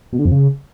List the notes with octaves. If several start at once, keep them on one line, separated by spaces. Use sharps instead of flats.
B2
D3
F2
C#3